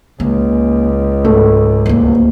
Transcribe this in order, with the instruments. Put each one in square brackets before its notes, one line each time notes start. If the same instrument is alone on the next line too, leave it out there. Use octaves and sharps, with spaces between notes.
[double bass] C#2 [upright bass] A#3
[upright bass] G#2 [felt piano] A3
[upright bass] D1 A#3